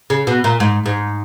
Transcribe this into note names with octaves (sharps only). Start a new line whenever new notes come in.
C#3
B2
A#2
G#2
G#2